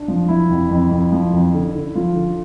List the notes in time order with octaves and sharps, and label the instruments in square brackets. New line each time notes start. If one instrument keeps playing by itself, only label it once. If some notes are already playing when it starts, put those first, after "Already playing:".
Already playing: [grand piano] D4
F3
F3 E4
F2
F2
F2
F3
F2
D3
D3
F3 F4
D3